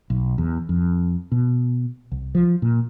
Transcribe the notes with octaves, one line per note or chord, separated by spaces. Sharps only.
B1
E2
F2
B2
C2
F3
A#2